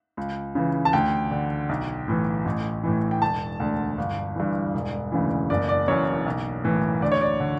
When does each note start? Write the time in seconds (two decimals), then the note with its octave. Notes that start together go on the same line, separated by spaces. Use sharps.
0.17 C#2
0.55 C#3 E3
0.85 A5
0.93 D2 G5
1.31 D3
1.69 B1
2.08 A2 E3
2.45 A1
2.84 A2 E3
3.11 G5
3.22 E1 A5
3.60 D2 D3
3.98 G1
4.36 G2 E3
4.74 E1
5.12 D2 C#3 E3
5.50 F#1 D5
5.69 D5
5.88 F#2 E3 C#5
6.26 B1
6.64 A2 E3
7.02 D2 D5
7.12 C#5
7.21 D5
7.40 D3